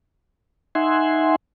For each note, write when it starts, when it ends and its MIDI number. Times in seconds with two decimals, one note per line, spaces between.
0.75 1.36 63
0.75 1.36 76
0.75 1.36 78
0.75 1.36 80
0.75 1.36 84